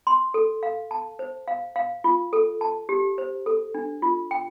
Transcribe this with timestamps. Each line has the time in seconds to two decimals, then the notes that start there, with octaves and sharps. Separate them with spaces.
0.07 C6
0.34 A4
0.63 F5
0.91 A5
1.19 C5
1.48 F5
1.76 F5
2.04 F4
2.33 A4
2.61 A5
2.89 G4
3.18 C5
3.46 A4
3.74 D4
4.02 F4
4.31 G5